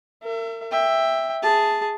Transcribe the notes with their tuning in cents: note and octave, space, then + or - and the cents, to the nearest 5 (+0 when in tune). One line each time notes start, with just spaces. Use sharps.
A#4 -35 E5 +35
E5 +0 G5 +15
G#4 +0 A5 +0